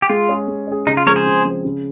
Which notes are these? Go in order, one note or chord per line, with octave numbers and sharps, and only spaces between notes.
G4
G#3 F4
C#4 G#4
G#3
C#4 G#4
C#3 D#4
F4
F3 G#3 C4 A#4 C#5
G#4 C5
C#3
F3 G#3 C4
C#3